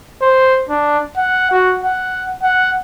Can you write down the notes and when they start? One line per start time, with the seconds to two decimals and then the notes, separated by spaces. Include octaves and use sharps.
0.21 C5
0.69 D4
1.17 F#5
1.51 F#4
1.84 F#5
2.43 F#5